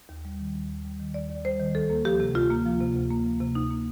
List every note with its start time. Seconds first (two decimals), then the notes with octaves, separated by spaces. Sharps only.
0.09 D#2
0.25 G3
0.39 D#3
0.55 D#2
0.70 D#2
0.85 G3
1.00 D#3
1.14 D#2 D5
1.30 D#2
1.45 G3 C5
1.60 D#3
1.75 D2 A4
1.90 A#3
2.05 F3 G4
2.20 C3
2.35 D2 F4
2.50 A#3
2.65 F3
2.80 C3
2.96 D2
3.11 A#3
3.26 F3
3.41 C3
3.55 D2 D#4
3.71 A#3